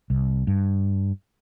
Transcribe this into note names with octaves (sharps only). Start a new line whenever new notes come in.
C2
G2